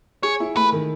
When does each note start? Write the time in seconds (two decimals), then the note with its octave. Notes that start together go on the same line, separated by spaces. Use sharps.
0.23 G#4 C#5
0.40 E4
0.56 A3 B4
0.72 D#3